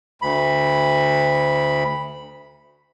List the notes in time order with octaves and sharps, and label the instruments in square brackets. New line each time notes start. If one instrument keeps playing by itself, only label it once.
[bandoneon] D2 B5